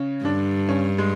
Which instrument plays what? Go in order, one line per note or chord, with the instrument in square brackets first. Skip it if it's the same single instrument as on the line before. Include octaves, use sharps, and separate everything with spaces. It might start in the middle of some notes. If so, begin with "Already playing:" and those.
Already playing: [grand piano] C#3 C#4
[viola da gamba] G2 [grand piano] D3 D4
[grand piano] C#3 C#4
G#3